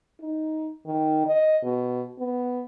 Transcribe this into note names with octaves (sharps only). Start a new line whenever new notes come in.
D#4
D#3
D#5
B2
B3